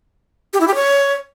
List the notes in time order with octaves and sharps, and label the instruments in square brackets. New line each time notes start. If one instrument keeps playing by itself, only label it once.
[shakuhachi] G4
E4
G4
C#5